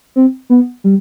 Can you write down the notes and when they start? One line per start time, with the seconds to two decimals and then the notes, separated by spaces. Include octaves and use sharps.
0.16 C4
0.50 B3
0.84 G3